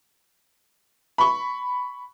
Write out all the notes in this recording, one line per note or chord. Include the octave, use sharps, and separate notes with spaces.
B5 C#6